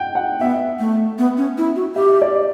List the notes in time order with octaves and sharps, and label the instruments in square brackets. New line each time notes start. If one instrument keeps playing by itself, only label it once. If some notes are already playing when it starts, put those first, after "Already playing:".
Already playing: [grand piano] F#5 G5
F#5
[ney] B3 [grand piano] E5
[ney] A3
B3
C#4
E4
F#4
[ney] G4 [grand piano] E5
[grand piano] D5